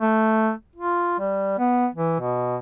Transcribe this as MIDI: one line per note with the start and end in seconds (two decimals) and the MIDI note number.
0.01 0.51 57
0.75 1.16 65
1.19 1.56 55
1.59 1.87 59
1.94 2.17 52
2.20 2.57 47